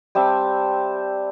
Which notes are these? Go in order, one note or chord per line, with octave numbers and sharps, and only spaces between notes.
G3 C4 E5 A5